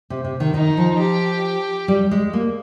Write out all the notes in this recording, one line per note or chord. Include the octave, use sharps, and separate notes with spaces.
C3
C3
D#3
D#3 D#4
F3
G4
G3
G#3
A#3